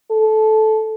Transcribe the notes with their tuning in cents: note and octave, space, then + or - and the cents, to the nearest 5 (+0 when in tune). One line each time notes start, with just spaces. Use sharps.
A4 -15